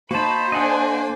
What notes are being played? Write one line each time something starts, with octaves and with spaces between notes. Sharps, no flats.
A#3 D#4 F#4 C5 A5 B5
D4 A4 D#5 F#5 G#5